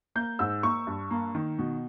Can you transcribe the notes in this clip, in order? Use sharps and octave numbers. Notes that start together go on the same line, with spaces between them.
A#3 G6
G#2 E6
A#3 C#6
G2
A#3
D#3
B2